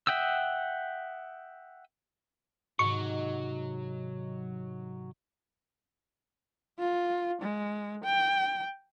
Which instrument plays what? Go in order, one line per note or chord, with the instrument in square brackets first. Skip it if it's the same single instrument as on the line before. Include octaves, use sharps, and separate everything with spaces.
[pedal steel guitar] E5 F#5 G5 D#6 E6
[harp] G#2 C3 D#3 [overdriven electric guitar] F#3 [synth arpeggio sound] C#6
[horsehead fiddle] F4
G#3
G5